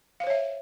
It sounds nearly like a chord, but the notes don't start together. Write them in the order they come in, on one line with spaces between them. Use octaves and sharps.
F5 C5 C#5 E5